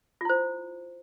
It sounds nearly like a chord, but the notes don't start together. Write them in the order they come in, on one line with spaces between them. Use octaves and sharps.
F4 E4 C5